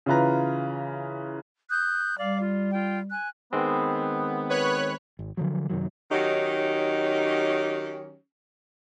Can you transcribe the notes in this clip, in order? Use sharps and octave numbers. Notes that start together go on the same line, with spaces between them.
C#3 E3 F4 B4 A#5
D#6 F#6 G6
G3 D5 F5 D6
F4
F4 G5
G#5 F#6
D#3 G#3 B3 C4
B4 C#5 F#6
G#1
D3 F3 F#3
F#2 C3 D#3 F#3
D#3 F#3 C#4 D#4 G4